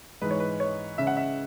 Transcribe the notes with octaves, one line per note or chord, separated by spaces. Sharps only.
G#2 E3 G#3 B4
C#5
B4
C#5
C#3 G#3 C#4 E5
F#5
E5